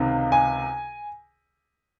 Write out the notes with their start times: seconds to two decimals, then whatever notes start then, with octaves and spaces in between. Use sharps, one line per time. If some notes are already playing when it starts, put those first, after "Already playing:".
Already playing: C#2 C3 D#3
0.32 G#5